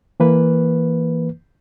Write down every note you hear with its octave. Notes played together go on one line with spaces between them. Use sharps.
E3 A#3 B4